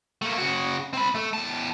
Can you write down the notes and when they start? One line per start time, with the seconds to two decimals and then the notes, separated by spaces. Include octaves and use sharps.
0.22 A3 A#3
0.38 C#3 F#4
0.93 C4 B5
1.15 A3 A4
1.33 E2 A5